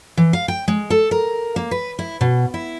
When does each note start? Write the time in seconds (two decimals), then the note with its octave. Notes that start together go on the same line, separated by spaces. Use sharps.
0.17 E3
0.33 F5
0.48 G5
0.68 G#3
0.90 A4
1.11 A#4
1.56 A#3
1.71 B4
1.99 E4
2.21 B2
2.54 E4